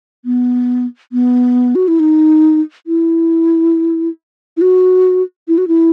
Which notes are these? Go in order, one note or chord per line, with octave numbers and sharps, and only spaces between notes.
B3
B3
F#4
E4
D#4
E4
E4
F#4
E4
F#4
E4